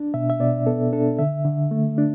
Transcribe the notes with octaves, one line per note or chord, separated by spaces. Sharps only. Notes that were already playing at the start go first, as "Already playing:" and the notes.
Already playing: D4
B2 E5
E5
B2 D5
B3 A4
D4 A4
D3 E5
D3
A3
D4